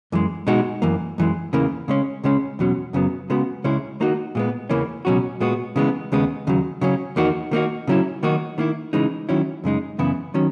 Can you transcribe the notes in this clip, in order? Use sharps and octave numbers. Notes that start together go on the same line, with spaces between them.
F#2 E3 G#3
B2 G#3 D#4 F#4
F#2 E3 A#3
F#2 E3 G#3
E2 C#3 E3 A#3
C#3 G#3 C#4
C#2 C#3 G#3 C#4
E2 B2 F#3 C#4
F#2 C#3 F#3 B3
C#3 G#3 B3 F#4
C#2 C#3 G#3 C#4 E4
D#3 A#3 D#4 F#4
A#2 G#3 B3
E2 C#3 E3 A#3 C#4
C#2 B2 F#3 C#4 F#4
A#2 G#3 B3 F#4
C#3 E3 G#3 B3
D#2 C#3 G#3 B3
D#2 C#3 F#3
C#3 F#3 C#4
E2 D#3 A#3 D#4 F#4
D#3 A#3 D#4 F#4
C#3 F#3 C#4 E4
D#3 F#3 A#3 D#4 F#4
D#3 A#3 E4
C#3 E3 G#3 D#4
D#3 F#3 C#4 E4
F#2 C#3 G#3 D#4
F#2 C#3 E3 B3 E4
D#3 F#3 C#4